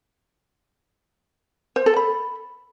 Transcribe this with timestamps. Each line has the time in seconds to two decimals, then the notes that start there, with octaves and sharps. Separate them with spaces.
1.76 C5
1.86 A4
1.96 B5